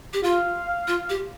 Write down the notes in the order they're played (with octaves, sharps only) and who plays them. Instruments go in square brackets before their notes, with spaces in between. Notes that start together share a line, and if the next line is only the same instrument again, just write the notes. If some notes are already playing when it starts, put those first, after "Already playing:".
[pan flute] G4
[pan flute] F4 [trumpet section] F5
[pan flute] F4
G4